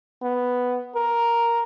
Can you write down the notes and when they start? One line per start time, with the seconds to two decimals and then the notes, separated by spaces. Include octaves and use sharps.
0.23 B3
0.95 A#4